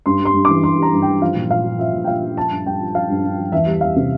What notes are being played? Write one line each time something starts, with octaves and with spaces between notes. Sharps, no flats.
G2 C6
G3
C6
G2
E3 D6
G2 C6
G3 A#5
G2
E3 G5
F3 F5
A#2
A#2 F5
F3
F3 E5
A#2
G5
A#2 F5
F3
F3 A5
G2
G2 G5
F3
F3 F5
G2
G2
F3
E2 E5
G3
E2 F5
C3